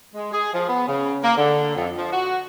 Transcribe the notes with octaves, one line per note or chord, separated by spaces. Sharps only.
G#3
G#4
F3
B3
C#3
A#3
D3
F2
F3
F#4